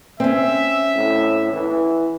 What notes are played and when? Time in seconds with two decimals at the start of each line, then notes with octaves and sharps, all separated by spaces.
0.20 C4 C#4 E5
0.95 A2
1.52 E3